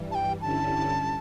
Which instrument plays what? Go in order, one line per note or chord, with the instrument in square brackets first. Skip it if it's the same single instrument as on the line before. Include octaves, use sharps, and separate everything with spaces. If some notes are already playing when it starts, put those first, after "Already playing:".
Already playing: [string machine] G2 E3 G3
[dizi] A5
G5
[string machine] G2 D3 G3 C#4 E4 [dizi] A5